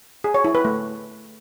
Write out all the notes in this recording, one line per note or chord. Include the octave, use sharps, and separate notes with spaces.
G#4
C#5
E4
B4
A3